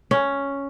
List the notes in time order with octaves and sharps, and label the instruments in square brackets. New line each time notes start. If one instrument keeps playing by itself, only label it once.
[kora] C#4